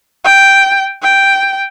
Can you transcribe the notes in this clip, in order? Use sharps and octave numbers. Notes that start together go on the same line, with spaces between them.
G5
G5